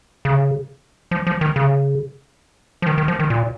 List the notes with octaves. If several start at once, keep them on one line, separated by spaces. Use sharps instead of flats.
C#3
F3
F3
D#3
C#3
F3
D#3
D#3
F3
D#3
A#2